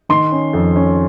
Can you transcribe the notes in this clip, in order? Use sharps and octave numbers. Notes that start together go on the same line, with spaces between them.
D#3 C6
C#4
F2
C#4